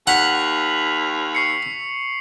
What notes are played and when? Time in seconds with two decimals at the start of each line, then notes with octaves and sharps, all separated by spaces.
0.07 D#2 F#5 B6 F7 F#7
1.35 C#6 C7 C#7